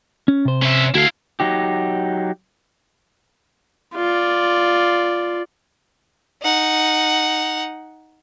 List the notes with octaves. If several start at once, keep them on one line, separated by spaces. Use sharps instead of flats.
C#4
C3 C5
C#4 E5
D2 E4 F#4 A4 F5
F#3 D#4 G4
F4 D5
D#4 F#5